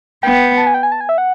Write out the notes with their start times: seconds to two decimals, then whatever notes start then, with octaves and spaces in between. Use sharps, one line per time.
0.23 B3 G5
0.58 A5
0.67 G#5
0.74 G5
0.83 G#5
0.92 A5
1.01 G#5
1.09 E5
1.18 F#5